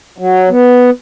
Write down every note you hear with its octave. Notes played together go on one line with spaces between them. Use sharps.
F#3
B3